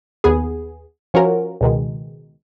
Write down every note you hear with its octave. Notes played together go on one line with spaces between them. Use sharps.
D#2 B3 G#4
F3 C#4 F4 F#4 A#4
C#2 B2 D#3 G#3